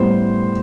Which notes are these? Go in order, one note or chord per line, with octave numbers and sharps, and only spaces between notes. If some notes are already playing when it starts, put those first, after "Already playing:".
Already playing: A2 G3 B3 C5